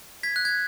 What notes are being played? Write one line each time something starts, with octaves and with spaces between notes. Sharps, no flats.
G#6 B6
F#6
G#6